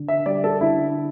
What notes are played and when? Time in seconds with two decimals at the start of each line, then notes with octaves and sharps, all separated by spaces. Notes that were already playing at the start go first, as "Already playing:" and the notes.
Already playing: D3
0.08 E5
0.26 G3 D5
0.44 A4
0.61 D3 E4